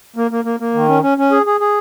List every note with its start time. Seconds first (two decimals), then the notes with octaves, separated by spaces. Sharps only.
0.16 A#3
0.31 A#3
0.45 A#3
0.60 A#3
0.74 D#3
0.88 C#4
1.02 C#4
1.18 C#4
1.32 G#4
1.46 G#4
1.61 G#4